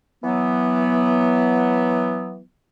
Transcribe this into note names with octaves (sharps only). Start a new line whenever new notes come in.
E3 F#3 B3